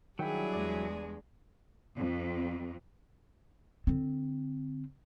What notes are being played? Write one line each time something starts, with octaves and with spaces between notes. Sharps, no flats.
D#3 F#3 G3 D4 E4 G#4 G5
E2 G#3 D5
F2
D3 C4